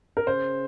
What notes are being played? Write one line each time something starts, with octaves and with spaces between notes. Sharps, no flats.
A#4
C#3 C5